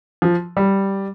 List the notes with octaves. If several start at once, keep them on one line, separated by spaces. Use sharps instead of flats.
F3
G3